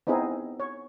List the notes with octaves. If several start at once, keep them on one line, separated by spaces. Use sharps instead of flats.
B3 C4 D#4 E4 G#4
C#5